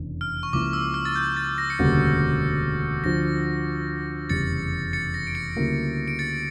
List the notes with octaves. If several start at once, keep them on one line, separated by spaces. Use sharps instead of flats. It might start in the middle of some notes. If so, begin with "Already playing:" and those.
Already playing: F1 E2 C#3 D4
F6
C#6
C#2 C#3 F3 A#3 E4 D6
E6
F6
A6
G6
A6
A#6
C#7
E1 D2 C#3 G3 A#3 A#6
D2 D3 F3 A#6
F1 E2 C#3 G3 A6 C#7
A6 C#7
A#6
D7
A6 C#7
D2 C#3 G3 A#3 E4
D7
A6 C#7